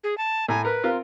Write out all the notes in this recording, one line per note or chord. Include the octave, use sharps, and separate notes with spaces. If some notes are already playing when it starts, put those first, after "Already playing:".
G#4
A5
A2 G#5 A#5
A#4 B4
C4 F4 A#4